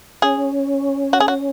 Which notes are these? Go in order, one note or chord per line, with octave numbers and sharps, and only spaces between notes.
C#4 G#4
F#4
G#4
F#4